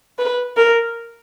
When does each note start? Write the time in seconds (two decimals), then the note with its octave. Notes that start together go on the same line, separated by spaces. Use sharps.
0.19 B4
0.57 A#4